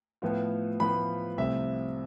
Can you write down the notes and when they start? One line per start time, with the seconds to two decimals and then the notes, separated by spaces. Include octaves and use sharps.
0.22 A2 F3 B3 F4
0.79 A2 F3 B3 F4 B5
1.38 C2 C3 F3 A3 C4 E5